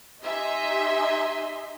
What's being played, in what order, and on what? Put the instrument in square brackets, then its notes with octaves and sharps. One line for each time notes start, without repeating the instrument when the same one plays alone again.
[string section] D#4 G4 D#5 E5 G#5 C6